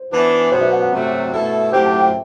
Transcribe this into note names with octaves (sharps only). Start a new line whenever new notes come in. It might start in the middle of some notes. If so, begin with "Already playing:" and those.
Already playing: C5
E3 B3 D4 B4
B2 F#3 B3 C5
D5
F#5
F#5
C3 F#3 A3
B2 A3 E4 A4 E5
A2 F#3 C4 G4 C5
A5
G5